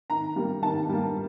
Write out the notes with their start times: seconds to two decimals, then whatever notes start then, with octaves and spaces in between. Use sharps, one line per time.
0.10 D#3 A#5
0.36 G3 A#3
0.62 D#3 A5
0.89 G3 A#3